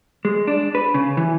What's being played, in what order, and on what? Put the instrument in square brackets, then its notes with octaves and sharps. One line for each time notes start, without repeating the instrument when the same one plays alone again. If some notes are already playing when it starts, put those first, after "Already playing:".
[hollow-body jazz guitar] G#3
D4
B4
C#3
E3